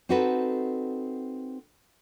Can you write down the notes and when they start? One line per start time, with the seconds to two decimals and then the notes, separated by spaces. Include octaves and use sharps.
0.09 C4 D#4 F#4 A4 B4